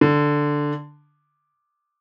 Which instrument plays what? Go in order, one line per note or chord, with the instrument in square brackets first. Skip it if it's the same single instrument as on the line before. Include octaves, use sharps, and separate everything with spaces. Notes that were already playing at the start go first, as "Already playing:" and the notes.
[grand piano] D3